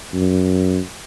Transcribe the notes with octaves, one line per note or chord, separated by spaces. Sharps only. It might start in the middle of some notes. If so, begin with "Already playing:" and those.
F#2